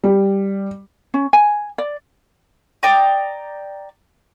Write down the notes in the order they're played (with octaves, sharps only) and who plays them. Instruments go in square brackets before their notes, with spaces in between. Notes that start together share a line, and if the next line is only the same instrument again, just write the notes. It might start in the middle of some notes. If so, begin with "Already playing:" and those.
[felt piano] G3
[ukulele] C#4
G#5
D5
[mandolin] D5 G5 A#5 D#6